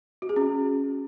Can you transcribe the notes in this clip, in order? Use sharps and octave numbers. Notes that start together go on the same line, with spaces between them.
F#4
G#4
C#4